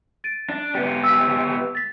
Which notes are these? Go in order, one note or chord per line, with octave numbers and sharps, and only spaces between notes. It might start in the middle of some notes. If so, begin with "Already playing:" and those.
A6 D7 D#7
D4
B3 G4
E6 B6
A6 B6